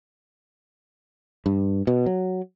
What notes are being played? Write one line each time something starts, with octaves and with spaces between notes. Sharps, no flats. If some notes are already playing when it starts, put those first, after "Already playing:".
G2
B2
F#3